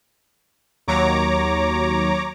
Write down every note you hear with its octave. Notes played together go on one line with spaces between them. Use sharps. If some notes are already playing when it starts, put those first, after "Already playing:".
D#2 F#3 C#5 A#5 D6